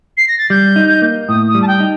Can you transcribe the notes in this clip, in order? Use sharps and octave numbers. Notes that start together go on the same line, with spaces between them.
C7
A#6
A6
G3 G6
D#4
A#3
A2 D#6
D#6
G3
A5
G5
D#4